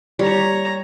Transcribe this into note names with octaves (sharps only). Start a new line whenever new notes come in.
G3 C#5 A#5